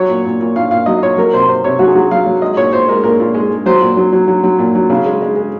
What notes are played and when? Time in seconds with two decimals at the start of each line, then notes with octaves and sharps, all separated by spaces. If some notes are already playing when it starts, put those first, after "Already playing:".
Already playing: F#3 C#5
0.09 A#2
0.25 A#2
0.40 A#2
0.56 A#2 F5
0.71 A#2 F5
0.86 F#3 D#5
1.02 A#2 C#5
1.17 F#3 A#4
1.33 C3 C5
1.49 C3 C5
1.64 C3 C#5
1.79 F#3 F#4
1.87 G#4
1.95 F#3 F#4
2.11 F#3 F5
2.26 F#3
2.42 G#3 D#5
2.57 A#2 C#5
2.73 A#2 C5
2.88 G#3 A#4
3.03 A#2 A#4
3.20 A#2
3.34 G#3
3.50 G#3
3.66 F#3 C5
3.81 A#2
3.97 F#3
4.13 F#3
4.28 F#3
4.44 F#3
4.58 A#2
4.75 F#3
4.90 C#3
5.06 G#3
5.22 G#3
5.36 G#3